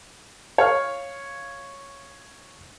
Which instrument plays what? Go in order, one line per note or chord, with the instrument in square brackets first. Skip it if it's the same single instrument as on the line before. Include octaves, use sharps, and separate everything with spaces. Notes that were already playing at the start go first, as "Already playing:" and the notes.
[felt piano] C#5 F5 F6